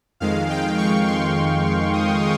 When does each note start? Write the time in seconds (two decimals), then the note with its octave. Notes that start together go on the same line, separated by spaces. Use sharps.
0.20 F2 D#3 G#3 F5
0.50 G5
0.78 C#6
1.07 C6
1.36 C6
1.65 C6
1.93 D#6